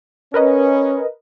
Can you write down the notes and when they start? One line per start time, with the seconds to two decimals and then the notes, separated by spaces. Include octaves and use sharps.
0.34 C#4 A#4 B4 D#5